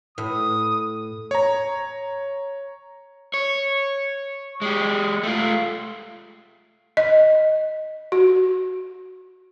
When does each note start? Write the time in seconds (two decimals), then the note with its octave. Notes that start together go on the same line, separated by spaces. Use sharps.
0.18 A2 D#6
1.31 C#5 A#5
3.34 C#5
4.62 G#3 G4
5.23 A3 F4
6.97 D#5
8.12 F#4